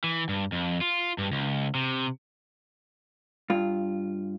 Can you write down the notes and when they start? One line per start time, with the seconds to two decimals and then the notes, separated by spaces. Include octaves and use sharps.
0.04 E3
0.29 G2
0.52 F2
0.81 F4
1.18 G2
1.32 C#2
1.75 C3
3.50 G2 F4